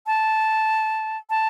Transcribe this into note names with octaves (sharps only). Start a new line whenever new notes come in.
A5
A5